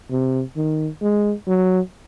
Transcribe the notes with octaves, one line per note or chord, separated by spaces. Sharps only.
C3
D#3
G#3
F#3